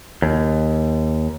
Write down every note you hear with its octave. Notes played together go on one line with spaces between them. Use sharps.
D#2